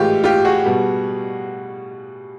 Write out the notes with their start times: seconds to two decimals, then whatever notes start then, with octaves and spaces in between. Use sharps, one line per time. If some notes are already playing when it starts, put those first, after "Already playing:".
Already playing: A2 E3 G#3 F4 G4
0.24 F4 G4
0.45 F#4 G#4
0.66 B2 G3